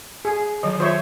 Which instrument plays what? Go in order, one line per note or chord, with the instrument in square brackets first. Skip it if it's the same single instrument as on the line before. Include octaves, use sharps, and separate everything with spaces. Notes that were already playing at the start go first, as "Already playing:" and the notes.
[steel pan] G#4
[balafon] D#3 F#3
[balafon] F4 [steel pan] C5 C#5 E5